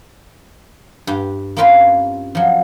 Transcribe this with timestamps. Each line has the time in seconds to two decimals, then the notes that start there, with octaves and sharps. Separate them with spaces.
1.07 G2 G4
1.57 A#3 C4 C#4 F4 G4 B4
2.35 F3 F#3